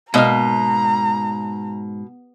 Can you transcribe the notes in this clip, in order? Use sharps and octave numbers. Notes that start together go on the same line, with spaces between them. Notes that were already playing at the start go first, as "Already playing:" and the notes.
G#2 B2 A#3 D#5 F5 A#5